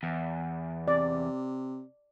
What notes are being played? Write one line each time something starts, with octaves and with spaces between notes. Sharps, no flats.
E2
C3 D5